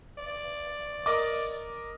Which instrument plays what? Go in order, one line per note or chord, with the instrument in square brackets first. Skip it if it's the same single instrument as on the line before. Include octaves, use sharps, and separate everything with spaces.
[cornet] D5
[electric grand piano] A#4 D#5 D6